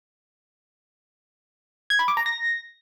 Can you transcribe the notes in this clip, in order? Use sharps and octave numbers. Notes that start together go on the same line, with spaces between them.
G#6
B5
D6
A#5
A#6